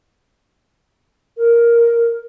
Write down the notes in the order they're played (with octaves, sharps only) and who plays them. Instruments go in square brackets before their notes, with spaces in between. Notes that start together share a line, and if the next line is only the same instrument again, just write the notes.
[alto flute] A#4